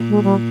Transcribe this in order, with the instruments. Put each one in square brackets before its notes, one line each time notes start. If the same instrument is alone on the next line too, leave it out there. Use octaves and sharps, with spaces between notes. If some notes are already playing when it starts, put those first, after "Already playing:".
Already playing: [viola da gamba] A#2
[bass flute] G#3
G3